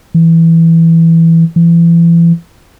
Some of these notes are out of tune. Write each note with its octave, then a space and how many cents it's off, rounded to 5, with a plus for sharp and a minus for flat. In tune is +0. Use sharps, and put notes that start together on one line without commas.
E3 +0
E3 +35